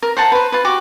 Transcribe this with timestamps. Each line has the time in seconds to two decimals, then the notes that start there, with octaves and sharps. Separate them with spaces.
0.02 A#4
0.17 C5 F#5 A5 A#5
0.32 B4 C5
0.52 F4 B4
0.65 F#4 G4 D6